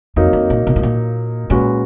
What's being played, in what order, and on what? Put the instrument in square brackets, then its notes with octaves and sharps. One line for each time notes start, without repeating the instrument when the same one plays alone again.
[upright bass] F2 [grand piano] F#3 A#3 D#4
[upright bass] F2
A#2
B2
A2
A#2
[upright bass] A#2 [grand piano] G#3 C#4 F#4 B4